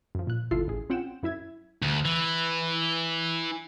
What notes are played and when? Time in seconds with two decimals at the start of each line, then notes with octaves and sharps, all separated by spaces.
0.15 F#2 F3
0.27 A#2 F#6
0.51 G1 D#2 E4 F4 A4 C7
0.67 A1 G#4
0.90 C4 C#4 F4 F#5 G5 E7
1.23 F#2 E4 E5 G#6
1.82 D2
2.05 E3